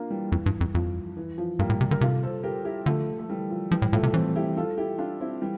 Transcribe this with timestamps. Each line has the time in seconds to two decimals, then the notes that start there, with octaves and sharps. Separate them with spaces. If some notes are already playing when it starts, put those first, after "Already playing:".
Already playing: A#3 D4 F4
0.10 E3 G3
0.32 F2 E3
0.46 G2
0.61 F2
0.75 F2 F3
1.17 E3
1.38 F3
1.59 G2 G3 A#3
1.70 A2
1.81 C3
1.91 D3 A#4
2.01 C3 F4 A4
2.23 A4 C5
2.43 G4 A#4
2.65 E4 G4
2.86 D3 F3 A3
3.19 A3
3.29 E3 G3
3.51 F3
3.71 E3 F3 G3
3.82 A2
3.92 A2 F3 A3
4.03 C3
4.13 E3 A3 C4
4.35 E4 G4
4.57 F4 A4
4.78 E4 G4
4.98 D4 F4
5.21 C4 E4
5.41 E3 G3